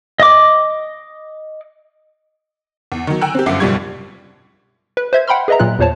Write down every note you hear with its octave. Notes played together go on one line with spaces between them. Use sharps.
D#5 D6
E2
D#3 F#3
G5 G#5 A#5 E6 F#6
C4 G4
G1 F#2 E5 F#5 D6 C7
F#1 B1 F2 G3 C#6 G#6
B4
C5 E5 G#6
F#5 G5 B5 C6 F6
G#4 B4 D#5 E5 A#5
A#2 F#3 F4 F#6
E2 A#2 C5 C#5 A5